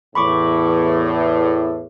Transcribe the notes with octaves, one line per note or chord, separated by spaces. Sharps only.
E2 A2 B5 C#6 D6